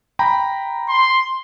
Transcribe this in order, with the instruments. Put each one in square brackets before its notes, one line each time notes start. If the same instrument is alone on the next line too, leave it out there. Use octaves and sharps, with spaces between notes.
[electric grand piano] G5 A#5 B5
[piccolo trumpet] C6